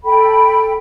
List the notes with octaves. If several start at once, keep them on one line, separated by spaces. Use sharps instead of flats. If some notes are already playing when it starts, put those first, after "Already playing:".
A4 G5 B5